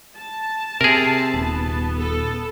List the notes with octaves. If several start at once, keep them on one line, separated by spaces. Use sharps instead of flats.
A5
C3 G#4 A#4 C5 E5
D#1 B3
A4